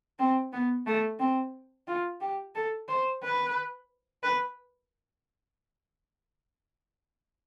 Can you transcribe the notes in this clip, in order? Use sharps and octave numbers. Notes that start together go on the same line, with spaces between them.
C4
B3
A3
C4
F4
G4
A4
C5
B4
B4